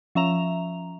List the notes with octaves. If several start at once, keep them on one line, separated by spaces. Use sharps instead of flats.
F3 C#4 E5 A#5 F7